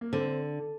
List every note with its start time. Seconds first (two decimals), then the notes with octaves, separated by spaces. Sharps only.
0.01 A#3
0.13 D3 C4